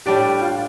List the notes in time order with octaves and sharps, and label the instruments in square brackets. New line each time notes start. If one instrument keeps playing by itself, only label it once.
[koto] A2 G3 D4 [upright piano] G4
[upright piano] F4